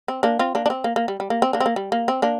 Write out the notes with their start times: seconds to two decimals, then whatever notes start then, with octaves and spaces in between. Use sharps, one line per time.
0.08 C4
0.23 A#3 D4
0.39 C4 F4
0.55 A#3 D4
0.66 D4
0.70 C4
0.84 A#3
0.96 A#3
1.08 G3
1.20 G3
1.30 A#3
1.42 C4
1.53 A#3 D4
1.60 C4
1.66 A#3
1.76 G3
1.92 A#3
2.08 C4
2.22 A#3 D4